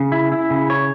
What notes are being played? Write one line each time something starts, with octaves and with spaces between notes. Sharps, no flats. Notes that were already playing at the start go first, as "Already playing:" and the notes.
Already playing: C#3
E4
E4
C#3
C#5